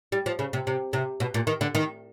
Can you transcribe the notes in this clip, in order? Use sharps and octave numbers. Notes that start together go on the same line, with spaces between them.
G3
F3
C#3
C3
C3
C3
B2
A#2
D#3
D3
D#3